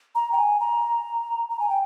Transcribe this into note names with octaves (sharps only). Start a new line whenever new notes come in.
A#5
G5
G#5
A#5
A#5
G#5
G5